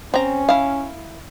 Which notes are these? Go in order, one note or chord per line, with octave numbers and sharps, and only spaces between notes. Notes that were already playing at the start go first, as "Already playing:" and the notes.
C4 C#4 A#5
E4 F5